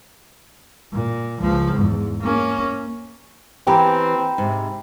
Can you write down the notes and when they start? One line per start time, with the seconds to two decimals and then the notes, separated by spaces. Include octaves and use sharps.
0.93 A#2
1.40 C#2 F3
1.76 E2 G#2
2.21 A#3 C#4
3.67 E3 A#3 C4 G4 G5 A#5 B5
4.38 G#2 C3